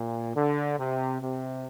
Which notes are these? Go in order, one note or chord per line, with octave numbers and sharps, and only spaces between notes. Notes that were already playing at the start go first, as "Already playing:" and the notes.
Already playing: A#2
D3
C3
C3